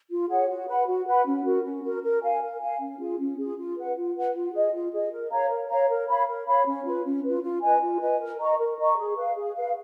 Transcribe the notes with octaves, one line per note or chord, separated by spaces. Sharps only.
F4
G#4 C#5 F#5
F#4
B4 F#5 B5
F#4
B4 F#5 B5
C#4
F#4 A#4
C#4
F#4 A#4
A#4
F5 G#5
A#4
F5 G#5
C#4
F4 G#4
C#4
F4 G#4
F4
B4 F#5
F4
B4 F#5
F4
G#4 D#5
F4
G#4 D#5
A#4
C#5 F5 A#5
A#4
C#5 F5 A#5
A#4
C#5 F5 B5
A#4
C#5 F5 B5
C#4
F4 B4
C#4
F4 B4
F4
B4 D#5 G#5
F4
B4 D#5 G#5
A#4
D#5 A#5 C#6
A#4
D#5 A#5 C#6
G#4
B4 F5
G#4
B4 F5